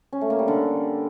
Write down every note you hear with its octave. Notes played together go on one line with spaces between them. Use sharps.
C#4
A3
A#3
G3
D3